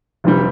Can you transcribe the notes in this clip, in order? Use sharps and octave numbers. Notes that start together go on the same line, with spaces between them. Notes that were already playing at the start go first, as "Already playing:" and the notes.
F1 F2 D3 G3